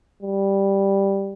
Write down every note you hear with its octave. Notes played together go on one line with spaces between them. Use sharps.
G3